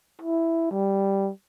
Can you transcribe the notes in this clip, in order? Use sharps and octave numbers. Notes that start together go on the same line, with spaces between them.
E4
G3